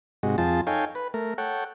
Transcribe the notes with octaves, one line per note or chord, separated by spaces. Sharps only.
G#2 C3 G#3 F#4
F2 F3 C4 F4 G#4 A5
D#4 A4 C#5 F5 G5 G#5
B4
A3 A#4
A4 C#5 F#5 G5